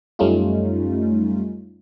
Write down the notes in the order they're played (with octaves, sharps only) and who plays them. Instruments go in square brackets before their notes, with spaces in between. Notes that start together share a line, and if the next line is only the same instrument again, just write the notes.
[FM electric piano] F#2 G3 A3 C#4 D#4 F4